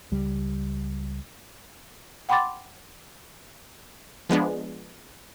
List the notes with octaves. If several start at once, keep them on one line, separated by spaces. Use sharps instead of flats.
C#2 G3
F#5 G5 B5 C6 D6 A6
F3 G#3 B3 D4